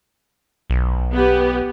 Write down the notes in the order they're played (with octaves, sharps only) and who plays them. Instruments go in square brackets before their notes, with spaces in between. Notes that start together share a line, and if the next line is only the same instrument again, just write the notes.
[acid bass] B1
[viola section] B3 G4